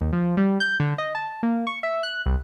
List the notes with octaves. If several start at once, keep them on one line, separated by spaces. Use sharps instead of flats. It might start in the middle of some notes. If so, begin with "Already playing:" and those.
D#2
F3
G3
G6
D3
D#5
A5
A#3
C#6
E5
F#6
C2